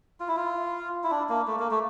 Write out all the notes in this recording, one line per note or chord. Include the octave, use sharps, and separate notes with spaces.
F4
E4
F4
E4
D4
A#3
A3
A#3
A3